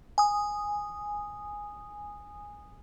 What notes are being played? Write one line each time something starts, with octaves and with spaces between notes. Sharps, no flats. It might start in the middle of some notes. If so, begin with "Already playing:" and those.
G#5 D#6